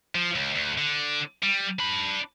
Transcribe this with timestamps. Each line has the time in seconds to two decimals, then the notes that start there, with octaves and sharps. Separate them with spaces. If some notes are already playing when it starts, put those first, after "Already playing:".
0.15 F3
0.35 C#2
0.55 D2
0.78 D3
1.43 G3
1.79 D4 B5